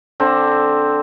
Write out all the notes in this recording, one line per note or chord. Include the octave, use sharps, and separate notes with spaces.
D3 C4